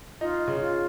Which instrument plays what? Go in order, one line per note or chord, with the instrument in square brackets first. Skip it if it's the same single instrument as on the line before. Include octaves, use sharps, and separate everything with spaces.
[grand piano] D#4 [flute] F4
[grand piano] C#3
[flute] F4